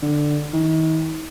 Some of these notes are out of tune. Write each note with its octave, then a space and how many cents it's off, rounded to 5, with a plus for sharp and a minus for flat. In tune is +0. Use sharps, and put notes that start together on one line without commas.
D3 +10
D#3 +40